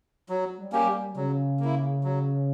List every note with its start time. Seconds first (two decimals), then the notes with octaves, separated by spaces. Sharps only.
0.29 F#3
0.59 G3
0.72 A#3 C#4 G4
0.87 G3
1.16 C#3 F#3
1.60 A#3 E4
2.04 F#3